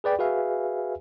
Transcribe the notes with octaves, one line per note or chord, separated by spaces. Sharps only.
G#4 B4 D5 G5 B5
F#4 G#4 B4 E5 F5 G#5